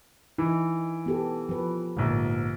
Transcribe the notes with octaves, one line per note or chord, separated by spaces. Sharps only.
E3 D#4
B3 G4 A4
F3 B4
A#1 G#2 D3